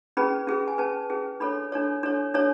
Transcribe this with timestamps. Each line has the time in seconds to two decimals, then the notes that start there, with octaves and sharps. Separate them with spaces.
0.17 C#4 G#4 B4 B5
0.47 C#4 G#4 B4
0.68 G#5
0.78 C#4 G#4 B4 A5
1.10 C#4 G#4 B4
1.40 D4 A4 C#5 B5
1.72 D4 A4 C#5
2.03 D4 A4 C#5
2.34 D4 A4 C#5